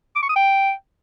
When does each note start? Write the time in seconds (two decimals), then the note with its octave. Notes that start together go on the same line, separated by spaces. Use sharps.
0.16 D6
0.22 C#6
0.29 D#6
0.36 G5